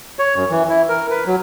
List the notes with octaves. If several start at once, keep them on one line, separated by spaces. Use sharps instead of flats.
C#5
F#2
E3
E4
A#4
B4
F#3